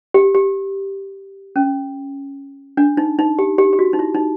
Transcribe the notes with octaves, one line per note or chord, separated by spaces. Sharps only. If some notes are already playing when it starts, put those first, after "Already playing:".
G4
G4
C#4
D4
D#4
D#4
G4
G4
G4
F#4
D#4
E4
D#4